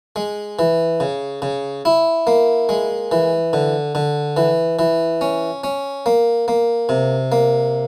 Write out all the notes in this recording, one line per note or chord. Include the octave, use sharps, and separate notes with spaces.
G#3
E3
C#3
C#3
E4
A#3
G#3
E3
D3
D3
E3
E3
C#4
C#4
A#3
A#3
C3
A#3